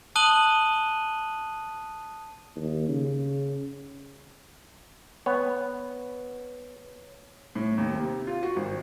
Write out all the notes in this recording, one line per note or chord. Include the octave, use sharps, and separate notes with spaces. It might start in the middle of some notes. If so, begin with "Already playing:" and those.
A5 D#6 F#6 D#7 F#7 G7
D#2
C#3
B3 C#5
A2
D#2
C3
F4
F#4
G#1